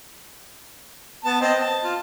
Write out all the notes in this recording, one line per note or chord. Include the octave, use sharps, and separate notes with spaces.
B3 A5
C4 D#5 A5
A5
F4